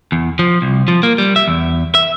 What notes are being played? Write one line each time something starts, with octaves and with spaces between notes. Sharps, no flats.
E2
F3
C2
F3
A#3
G3
E5
E2
E5